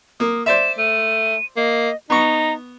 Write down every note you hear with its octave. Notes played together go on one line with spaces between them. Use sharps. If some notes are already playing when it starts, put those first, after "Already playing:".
A#3 D#6
C5 D5 E5 E7
A3 D#7
A#3 D#5
B3 D#4 A#5 C#6